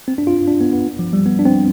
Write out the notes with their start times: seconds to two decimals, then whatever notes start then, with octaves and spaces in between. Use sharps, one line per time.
0.08 C4
0.18 D4
0.27 F4
0.47 D4
0.61 B3
0.73 B3
0.99 F3
1.13 G3
1.26 B3
1.39 D4
1.45 C4